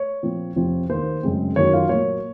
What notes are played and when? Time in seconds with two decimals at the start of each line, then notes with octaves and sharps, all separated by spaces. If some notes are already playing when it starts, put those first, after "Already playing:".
Already playing: C#5
0.23 A#2 F3 C4
0.56 F2 C3 F3 C4
0.89 D#2 D#3 A#3 C5
1.23 F#2 C#3 G#3 C4
1.56 F#2 D#3 F#3 A#3 C#5
1.73 F4 F5
1.89 A#2 F#3 A#3 C#5